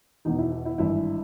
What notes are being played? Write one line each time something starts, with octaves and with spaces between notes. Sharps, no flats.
E1 E2 B2 D#4
E4
E4
E4
G#1 G2 E3 E4